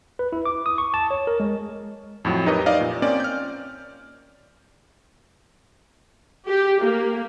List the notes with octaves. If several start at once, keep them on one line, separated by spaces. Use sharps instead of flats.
B4
E4
D6
D#6
C#6
A5
C#5
A#4
G#3
F2 A2 F#3
D#4 G4 A#4 B4 C#5 D#5
D5 D#5 F5
A#2
A#3 C4 C#4 D5
F6 G6
G4
A#3